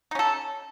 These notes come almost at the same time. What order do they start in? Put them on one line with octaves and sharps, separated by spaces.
D#4 C#4 A4